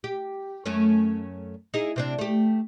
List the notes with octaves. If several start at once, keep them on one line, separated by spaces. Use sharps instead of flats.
G4
F#2 A3 C#4
D#4 E4 G#4
C3 C4 D4
A3 G4